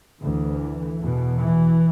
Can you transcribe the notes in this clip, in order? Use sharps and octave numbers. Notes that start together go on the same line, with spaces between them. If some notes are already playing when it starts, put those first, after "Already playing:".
D2 E3
E2 B2
E3